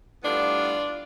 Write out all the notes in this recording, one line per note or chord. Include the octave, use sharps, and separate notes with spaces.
A2 G3 B3 D4 F4